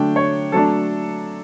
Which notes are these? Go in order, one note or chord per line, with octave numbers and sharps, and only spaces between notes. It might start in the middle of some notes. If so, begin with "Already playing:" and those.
Already playing: D3 F#3 A3 D4 G5
C#5
F#3 A3 D4 A4